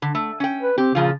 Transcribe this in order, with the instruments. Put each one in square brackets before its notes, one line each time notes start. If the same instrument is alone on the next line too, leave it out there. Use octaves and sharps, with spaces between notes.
[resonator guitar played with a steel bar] D3
A3
C#4 G5
[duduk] B4
[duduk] C4 [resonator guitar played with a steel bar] G4
[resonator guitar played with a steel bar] A#2 F3 F4 [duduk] C#3